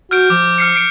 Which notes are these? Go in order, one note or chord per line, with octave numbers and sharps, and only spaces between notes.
F#4 F6 G6 D7
F3 D6
F6 C7 C#7
C7 D7